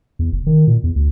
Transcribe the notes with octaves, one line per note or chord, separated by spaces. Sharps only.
E2
F1
D#3
A#2
E2
D2